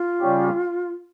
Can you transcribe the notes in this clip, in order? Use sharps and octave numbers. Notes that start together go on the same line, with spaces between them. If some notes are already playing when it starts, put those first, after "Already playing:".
Already playing: F4
C#3 G3 C#4 G4